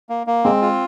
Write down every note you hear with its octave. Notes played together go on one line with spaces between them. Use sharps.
A#3
A#3
G#3 C4
F4